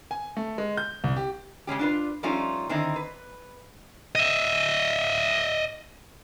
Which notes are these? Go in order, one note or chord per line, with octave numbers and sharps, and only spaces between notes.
G#5
A3
G#3
G6
C2
G4
C#3 G#3 C#4 G4
D4 F4 B4
F3 G3 A3 C#4 D#4 F4
D3 D#3 C4 D#4 E4
B4
D#5 E5